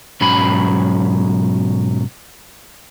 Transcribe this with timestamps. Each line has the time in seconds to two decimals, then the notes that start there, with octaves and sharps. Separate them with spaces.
0.21 B1 G#2 F#3 C#4 B5